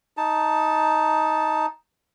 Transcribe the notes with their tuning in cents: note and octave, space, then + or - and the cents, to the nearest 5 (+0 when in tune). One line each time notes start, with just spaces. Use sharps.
D#4 +10 A5 +0